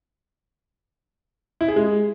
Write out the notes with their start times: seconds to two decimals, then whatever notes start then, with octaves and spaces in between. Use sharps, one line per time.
1.61 E4
1.68 G#4
1.76 G#3